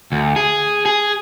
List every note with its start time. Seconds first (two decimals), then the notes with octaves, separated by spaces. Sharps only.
0.12 D2
0.36 G#4
0.86 G#4